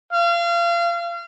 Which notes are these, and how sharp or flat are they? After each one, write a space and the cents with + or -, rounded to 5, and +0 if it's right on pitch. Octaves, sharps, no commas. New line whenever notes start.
F5 -30